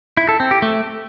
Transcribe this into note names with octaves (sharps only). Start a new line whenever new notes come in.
E4
A4
C4
G4
A3